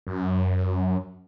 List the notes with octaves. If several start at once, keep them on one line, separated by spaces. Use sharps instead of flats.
F#2